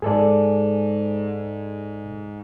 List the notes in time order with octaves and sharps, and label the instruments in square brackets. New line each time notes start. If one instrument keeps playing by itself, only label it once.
[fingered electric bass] G#2 G#3 [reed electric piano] G#4 A4 D5